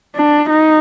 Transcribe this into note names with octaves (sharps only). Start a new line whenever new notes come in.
D4
D#4